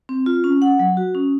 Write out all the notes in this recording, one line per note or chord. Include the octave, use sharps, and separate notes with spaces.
C4
F4
C#4
F#5
F#3
F#4
C#4